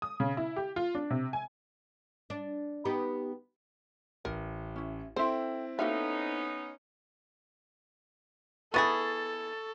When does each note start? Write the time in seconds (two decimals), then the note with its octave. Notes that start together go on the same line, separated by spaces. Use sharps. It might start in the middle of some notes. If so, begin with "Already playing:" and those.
0.02 D#6
0.20 C#3
0.37 E4
0.56 G4
0.76 F4
0.95 D4
1.10 C3
1.33 G#5
2.30 D4
2.85 B3 D#4 G4
4.25 A1 A#4
4.76 C#4 E4
5.16 C4 E4 A4 C5 E5 G5
5.79 A#3 B3 C#4 D#4 F#4 A4 E5 F5
8.74 B3 E4 G#4 A4 C#6 A6